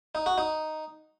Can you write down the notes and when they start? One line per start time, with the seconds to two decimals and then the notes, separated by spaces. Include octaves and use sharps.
0.15 D#4
0.26 F#4
0.38 D#4